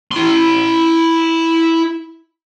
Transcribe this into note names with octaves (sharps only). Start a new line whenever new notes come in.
E4 C6